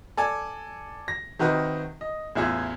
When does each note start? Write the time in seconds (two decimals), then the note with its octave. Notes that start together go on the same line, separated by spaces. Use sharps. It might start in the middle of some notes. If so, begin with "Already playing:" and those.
0.17 A4 D5 G#5
1.08 A#6
1.39 C3 D#3 F#4 B4 D#5
2.01 D#5
2.35 A1 E2 E4 F4 G#4 E6